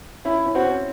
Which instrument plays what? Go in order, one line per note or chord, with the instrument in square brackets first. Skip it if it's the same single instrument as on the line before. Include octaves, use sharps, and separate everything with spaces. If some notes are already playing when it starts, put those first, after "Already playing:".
[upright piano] C#4 [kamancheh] E4
[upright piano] E4
C#4
[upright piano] C4 [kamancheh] F#4
[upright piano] C#4
C4